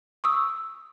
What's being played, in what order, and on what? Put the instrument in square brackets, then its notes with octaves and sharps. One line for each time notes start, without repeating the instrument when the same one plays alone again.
[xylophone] C#6 D#6 E6